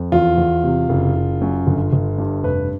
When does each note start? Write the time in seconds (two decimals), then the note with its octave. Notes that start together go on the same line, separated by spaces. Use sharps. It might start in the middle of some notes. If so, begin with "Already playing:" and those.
Already playing: F2
0.12 E2 F4
0.38 E2
0.64 C3
0.89 F#1
1.15 F#1
1.41 F#2
1.67 G1
1.93 G1
2.18 G2
2.43 F1 B4